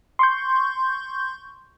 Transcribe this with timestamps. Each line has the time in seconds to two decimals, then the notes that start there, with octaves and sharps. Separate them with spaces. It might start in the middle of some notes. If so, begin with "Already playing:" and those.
0.19 C6 C#6 G6